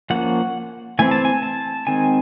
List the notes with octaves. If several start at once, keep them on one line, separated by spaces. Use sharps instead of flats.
F3 A#3 C#4 F#5
E3 A3 C4 G#5
A5
G#5
A5
D#3 G#3 C4 G#5